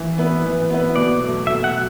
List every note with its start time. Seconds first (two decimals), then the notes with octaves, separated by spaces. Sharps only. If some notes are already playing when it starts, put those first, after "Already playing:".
Already playing: E3
0.18 B3 E4 B4
0.45 E3
0.70 B3 E4 B4
0.96 B2 D5
1.21 F#3 A3
1.47 B2 E5
1.64 F#5
1.73 F#3